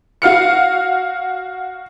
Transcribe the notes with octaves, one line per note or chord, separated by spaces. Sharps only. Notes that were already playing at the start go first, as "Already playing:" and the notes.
F#4 F5 F6 C#7